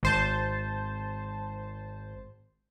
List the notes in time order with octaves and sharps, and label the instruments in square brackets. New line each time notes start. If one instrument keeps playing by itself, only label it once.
[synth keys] G#1 C5 A5